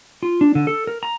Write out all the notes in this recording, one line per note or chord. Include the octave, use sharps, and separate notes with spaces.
F4
D4
D3
A4
A#4
A#5